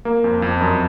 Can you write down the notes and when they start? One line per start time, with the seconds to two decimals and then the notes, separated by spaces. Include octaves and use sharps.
0.05 A#3
0.24 F2
0.42 F2
0.61 F#2